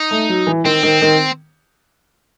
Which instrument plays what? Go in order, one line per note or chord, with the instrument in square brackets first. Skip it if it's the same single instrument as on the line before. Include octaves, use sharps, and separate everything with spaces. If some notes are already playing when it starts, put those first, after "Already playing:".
Already playing: [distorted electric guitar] D#4
[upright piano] A3
F#3
E3
[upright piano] D#3 [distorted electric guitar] C4
[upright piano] D#3
D#3